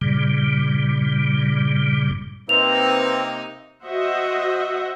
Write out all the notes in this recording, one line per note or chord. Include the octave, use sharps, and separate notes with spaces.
G2 A#2 C#3 G3
C3 A#3 C4 D#4 B4 F7
F#4 C5 D#5 E5 F#5